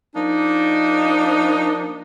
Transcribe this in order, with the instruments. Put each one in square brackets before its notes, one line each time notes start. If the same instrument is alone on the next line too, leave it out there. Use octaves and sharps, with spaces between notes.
[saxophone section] F3 A#3 D4 D#4